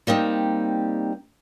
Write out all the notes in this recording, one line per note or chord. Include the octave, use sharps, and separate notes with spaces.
G3 A#3 C4 D#4